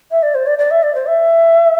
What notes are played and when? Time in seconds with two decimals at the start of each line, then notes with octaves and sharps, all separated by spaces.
0.11 E5
0.23 D5
0.35 C5
0.47 D5
0.59 D5
0.71 E5
0.83 D5
0.95 C5
1.06 E5